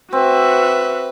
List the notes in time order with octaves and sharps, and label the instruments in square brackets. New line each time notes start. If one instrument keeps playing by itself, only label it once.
[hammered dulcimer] C4 [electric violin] F#4 E5 [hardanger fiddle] B4